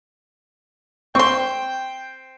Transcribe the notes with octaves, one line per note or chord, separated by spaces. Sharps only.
C4 G5 C6 C#6